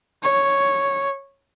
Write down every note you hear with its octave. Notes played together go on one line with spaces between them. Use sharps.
C#5